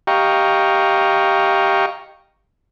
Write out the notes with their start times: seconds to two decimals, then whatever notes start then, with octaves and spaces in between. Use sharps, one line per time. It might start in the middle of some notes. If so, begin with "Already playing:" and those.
0.07 G4 D#5 F5 G5 A#5 C#6